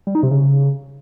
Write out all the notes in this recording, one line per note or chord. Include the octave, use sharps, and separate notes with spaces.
G3
D#4
C3
C#3